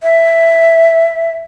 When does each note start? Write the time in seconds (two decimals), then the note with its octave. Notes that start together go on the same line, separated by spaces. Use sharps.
0.03 E5